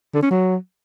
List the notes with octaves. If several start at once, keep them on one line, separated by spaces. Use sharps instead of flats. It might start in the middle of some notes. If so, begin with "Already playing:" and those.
D3
C#4
F#3